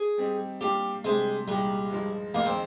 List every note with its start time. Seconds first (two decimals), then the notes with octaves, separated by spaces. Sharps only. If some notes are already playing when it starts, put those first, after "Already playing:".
Already playing: G#4
0.18 G3 C4 D#4 G4
0.61 G3 A#3 D4 F4 G4
1.04 C3 G3 G#3 D4 G4 C5
1.48 C2 A#2 G3 G#3 D#4
1.91 G2 F3 G#3 D#4
2.34 F2 D#3 G#3 A#3 D#4
2.45 C4